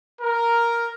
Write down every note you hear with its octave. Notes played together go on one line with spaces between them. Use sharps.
A#4